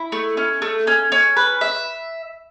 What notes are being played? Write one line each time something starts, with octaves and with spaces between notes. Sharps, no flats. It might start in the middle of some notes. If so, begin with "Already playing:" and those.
Already playing: E4
A3
C#4
A3
C#4
C#4
B4
E5